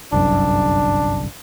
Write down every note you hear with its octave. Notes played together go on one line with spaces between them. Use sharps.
G1 C2 F#2 D4